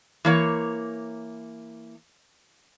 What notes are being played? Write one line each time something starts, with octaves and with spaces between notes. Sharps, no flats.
E3 A#3 C#5